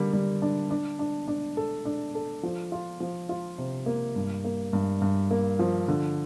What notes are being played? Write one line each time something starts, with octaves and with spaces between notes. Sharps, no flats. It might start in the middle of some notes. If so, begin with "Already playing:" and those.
Already playing: D3 G3 A#3
G3
D4
D4
D4
D4
A4
D4
A4
F3
F4
F3
F4
C3
A#3
G2
A#3
G2
G2
A#3
F3
D3